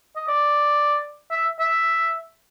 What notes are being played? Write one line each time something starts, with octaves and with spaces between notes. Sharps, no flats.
D#5
D5
E5
E5